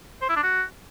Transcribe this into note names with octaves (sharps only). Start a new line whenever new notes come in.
C5
E4
D4
F#4